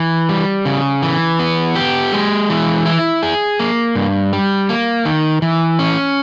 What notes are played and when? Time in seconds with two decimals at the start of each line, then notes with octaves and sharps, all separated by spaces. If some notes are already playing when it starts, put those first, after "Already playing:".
Already playing: E3
0.29 G3
0.65 C#3
1.03 E3
1.39 B3
1.75 G4
2.12 G#3
2.50 E3
2.86 E4
3.23 G#4
3.59 A#3
3.95 G2
4.33 G3
4.69 A#3
5.05 D#3
5.42 E3
5.79 C#4